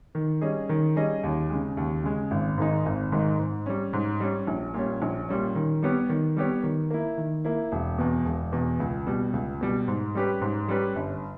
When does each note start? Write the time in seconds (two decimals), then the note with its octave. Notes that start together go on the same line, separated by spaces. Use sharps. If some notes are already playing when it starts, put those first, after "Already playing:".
0.15 D#3
0.41 G3 C#4 G#4 D#5
0.69 D#3
0.96 G3 C#4 G#4 D#5
1.23 D#2
1.50 C#3 G#3
1.77 D#2
2.04 C#3 G#3
2.31 G#1
2.58 G#2 D#3 G#3 D#4
2.86 G#1
3.12 G#2 D#3 G#3 D#4
3.39 G#2
3.66 G3 C#4
3.93 G#2
4.20 G3 C#4
4.47 A#1
4.74 A#2 G3 C#4
5.02 A#1
5.29 A#2 G3 C#4
5.55 D#3
5.82 G3 B3 G4 C#5
6.09 D#3
6.37 G3 B3 G4 C#5
6.63 D#3
6.91 A#3 E4
7.18 D#3
7.45 A#3 E4
7.72 E1
7.98 E2 B2
8.25 E1
8.52 E2 B2
8.80 C#2
9.07 B2 G3
9.33 C#2
9.61 B2 G3
9.88 G#2
10.15 G3 C#4 G4 B4
10.41 G#2
10.68 G3 C#4 G4 B4
10.96 G1